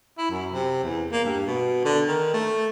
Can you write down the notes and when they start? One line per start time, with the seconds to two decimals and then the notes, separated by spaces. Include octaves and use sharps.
0.18 E4
0.30 F#2
0.53 C3
0.84 E2
1.12 A#3
1.25 G2
1.46 B2
1.85 D3
2.08 D#3
2.33 A3